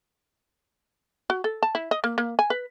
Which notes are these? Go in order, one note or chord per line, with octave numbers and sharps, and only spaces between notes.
F#4
A4
A5
E4
D#5
A#3
A#3
G#5
B4